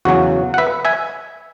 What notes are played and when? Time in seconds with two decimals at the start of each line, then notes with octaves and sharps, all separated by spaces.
0.05 E2 C#3 F#3 C#4 F#4
0.54 F#5
0.58 B4 E5
0.85 E5 G#5